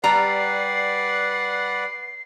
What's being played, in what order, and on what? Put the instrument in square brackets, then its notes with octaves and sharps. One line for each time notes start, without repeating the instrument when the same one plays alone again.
[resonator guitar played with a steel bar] G3 A#5 [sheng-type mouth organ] B4 D5 F#5 [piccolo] C7